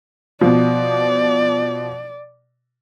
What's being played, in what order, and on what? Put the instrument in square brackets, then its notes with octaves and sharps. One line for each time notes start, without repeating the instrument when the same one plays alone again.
[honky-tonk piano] B2 F3 [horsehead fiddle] D5